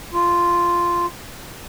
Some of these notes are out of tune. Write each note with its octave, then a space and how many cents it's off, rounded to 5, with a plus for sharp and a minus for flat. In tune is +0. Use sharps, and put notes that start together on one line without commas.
F4 -5